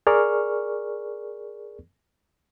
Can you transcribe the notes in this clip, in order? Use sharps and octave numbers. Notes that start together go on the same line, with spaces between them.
G#4 A#4 D5 C#6 F6